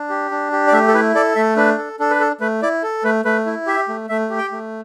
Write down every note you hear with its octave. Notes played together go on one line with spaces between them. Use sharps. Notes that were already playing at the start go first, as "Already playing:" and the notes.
Already playing: D4
G4
D4
G4
D5
A3 E5
A4
E4 B4
A4 D5
A3 E5
D4 B4
A4
D4 A4
B4
A4
A3 B4
E4 D5
A4
A3 B4
A3 B4
E4
G4 E5
A3
A3 E5
G4
G5
A3